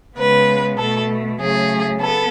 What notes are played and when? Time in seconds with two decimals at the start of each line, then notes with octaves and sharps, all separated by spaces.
0.17 C#3 G#3 B3 B4
0.77 B2 A3 A4
1.38 C#3 F#3 A3 G#4
2.00 B3 A4